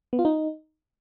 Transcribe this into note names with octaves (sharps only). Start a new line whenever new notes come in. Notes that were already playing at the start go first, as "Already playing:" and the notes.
B3
F4
D#4